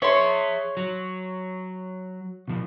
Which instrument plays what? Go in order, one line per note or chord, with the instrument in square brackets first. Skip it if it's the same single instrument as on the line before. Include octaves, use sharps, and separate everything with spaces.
[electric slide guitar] G#4 E5 [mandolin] C#5 C6
[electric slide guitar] F#3
B2 F3